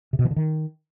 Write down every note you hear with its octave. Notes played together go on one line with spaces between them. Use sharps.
C3
B2
E3
D3
D#3